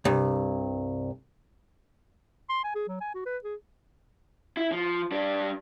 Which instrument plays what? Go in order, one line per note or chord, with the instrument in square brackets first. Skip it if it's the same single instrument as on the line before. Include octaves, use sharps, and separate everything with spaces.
[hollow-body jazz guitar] C2 G2
[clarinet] C6
G#5
G#4
F#3
G#5
F#4
B4
G#4
[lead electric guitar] E4
F3
G3 D4